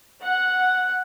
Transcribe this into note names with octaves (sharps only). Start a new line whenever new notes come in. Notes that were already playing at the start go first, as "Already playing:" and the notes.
F#5